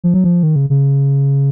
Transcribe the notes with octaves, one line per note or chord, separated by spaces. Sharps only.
F3
F#3
F3
D#3
C#3
C#3